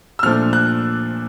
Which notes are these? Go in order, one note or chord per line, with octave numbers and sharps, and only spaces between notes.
E6
A#2 F3 A3 D4 F6
F#6